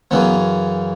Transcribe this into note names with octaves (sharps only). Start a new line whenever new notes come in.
F#2 C#3 E3 B3